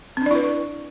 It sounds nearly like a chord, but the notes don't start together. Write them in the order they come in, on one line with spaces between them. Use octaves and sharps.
C4 D4 D5 E4 B4